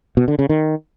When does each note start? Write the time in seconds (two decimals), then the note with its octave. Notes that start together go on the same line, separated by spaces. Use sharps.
0.17 B2
0.28 D3
0.39 C#3
0.49 D#3